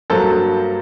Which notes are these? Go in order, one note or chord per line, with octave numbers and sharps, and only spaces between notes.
G2 F#3 A#3 A4 C5